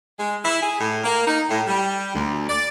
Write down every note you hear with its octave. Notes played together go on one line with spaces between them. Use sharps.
G#3
E4
G#4
A2
A#3
D#4
A2
G3
D2
D5